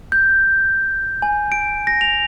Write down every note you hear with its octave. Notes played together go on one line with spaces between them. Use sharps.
G6
G#5
D7
A#6
F7